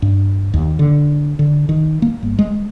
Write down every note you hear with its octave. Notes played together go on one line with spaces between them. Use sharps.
G2
D#2
D3
D3
D#3
A#3
G1
G#3